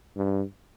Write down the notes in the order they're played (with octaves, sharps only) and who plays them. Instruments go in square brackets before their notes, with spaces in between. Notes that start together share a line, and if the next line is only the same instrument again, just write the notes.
[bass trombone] G2